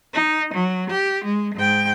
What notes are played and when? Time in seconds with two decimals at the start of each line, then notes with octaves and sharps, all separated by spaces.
0.14 D#4
0.54 F#3
0.90 G4
1.24 G#3
1.55 G#2 G5